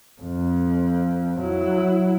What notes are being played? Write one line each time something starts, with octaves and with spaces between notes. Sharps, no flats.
F2
F#3 E4